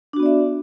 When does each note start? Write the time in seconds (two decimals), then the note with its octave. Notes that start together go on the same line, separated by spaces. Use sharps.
0.13 D4
0.16 F#4
0.20 B3
0.23 D5
0.26 E5